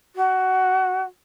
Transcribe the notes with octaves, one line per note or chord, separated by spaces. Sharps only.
F#4